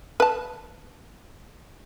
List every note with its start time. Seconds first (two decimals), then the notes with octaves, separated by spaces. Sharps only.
0.20 B4 A5